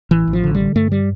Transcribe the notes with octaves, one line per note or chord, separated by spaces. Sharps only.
A1 E3
A1
F3
D3
G3
D3
G2 A3
G3